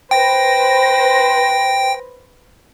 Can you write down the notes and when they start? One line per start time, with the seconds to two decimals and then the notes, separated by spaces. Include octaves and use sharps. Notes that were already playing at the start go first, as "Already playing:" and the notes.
0.11 B4 C5 G5 A#6